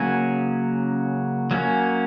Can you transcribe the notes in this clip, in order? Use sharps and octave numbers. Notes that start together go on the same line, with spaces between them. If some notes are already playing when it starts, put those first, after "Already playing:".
Already playing: C#3 F#3 A#3 C#4 G#5
F#3 A#3 C#4